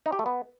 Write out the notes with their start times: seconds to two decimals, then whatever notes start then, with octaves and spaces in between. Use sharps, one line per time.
0.06 D#4
0.12 G4
0.19 A3
0.26 B3